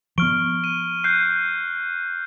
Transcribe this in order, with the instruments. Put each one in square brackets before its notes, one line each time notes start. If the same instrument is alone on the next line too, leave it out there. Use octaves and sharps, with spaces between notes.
[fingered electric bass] F3 B3 [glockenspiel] C#6 D7 [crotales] F6 G7
[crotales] D#7
[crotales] F#6 G6 D#7 [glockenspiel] C7